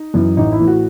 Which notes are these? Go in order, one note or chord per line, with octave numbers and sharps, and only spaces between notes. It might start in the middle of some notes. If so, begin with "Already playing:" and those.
Already playing: D#4
F#2 E3
A1 D#4
E4
A2 E3
F#4